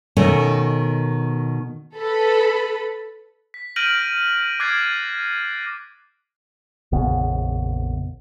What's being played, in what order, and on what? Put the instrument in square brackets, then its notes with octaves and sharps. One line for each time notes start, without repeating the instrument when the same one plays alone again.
[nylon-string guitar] B2 D#3 A3 C#4
[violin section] A4 B4 B5
[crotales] B6
F6 G6 A#6 D7 D#7 F#7
D6 F#6 G#6 A6 C7 D7
[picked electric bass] A#1 F2 C#3 B3